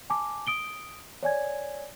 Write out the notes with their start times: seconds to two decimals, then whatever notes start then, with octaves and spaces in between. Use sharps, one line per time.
0.10 G#5 A5 D6
0.47 D#6 D7 G7
1.23 C#5 D5 G#5 G#6